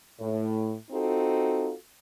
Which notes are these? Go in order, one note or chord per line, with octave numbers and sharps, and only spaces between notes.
A2
C4 D#4 F4 F#4 A4